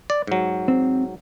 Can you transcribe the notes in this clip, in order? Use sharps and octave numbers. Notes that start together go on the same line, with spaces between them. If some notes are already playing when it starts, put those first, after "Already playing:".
D5
G#2 F#3
C4